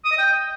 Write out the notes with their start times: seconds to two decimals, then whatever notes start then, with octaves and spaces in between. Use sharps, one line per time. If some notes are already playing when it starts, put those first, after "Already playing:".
0.05 D#6
0.12 D#5
0.19 G5